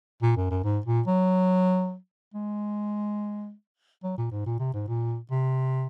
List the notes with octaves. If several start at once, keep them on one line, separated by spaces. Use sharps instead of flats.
A#2
F#2
F#2
G#2
A#2
F#3
G#3
F#3
A#2
G#2
A#2
C3
G#2
A#2
C3